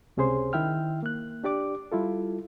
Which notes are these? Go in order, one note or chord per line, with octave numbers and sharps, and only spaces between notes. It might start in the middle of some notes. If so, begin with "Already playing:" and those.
C#2 C3 C#4 G#4 C5 C6
D#3 E4 E5 G5 F6
A#3 F#6
D4 G4 D5 D6
G3 E4 F4 A4